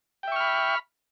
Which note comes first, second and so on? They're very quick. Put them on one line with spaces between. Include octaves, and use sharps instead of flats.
G5 E5 C#6 F6 B5